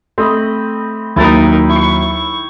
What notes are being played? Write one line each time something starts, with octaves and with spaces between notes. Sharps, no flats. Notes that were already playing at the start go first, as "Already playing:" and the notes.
A3 C4 D#5 B5
D#2 F#3 D#4 E4 A#4 G5 B5 A6
E4 C#6